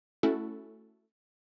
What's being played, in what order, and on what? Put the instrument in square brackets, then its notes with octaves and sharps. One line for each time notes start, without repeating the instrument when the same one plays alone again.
[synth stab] A3 C#4 E4 F#4 A4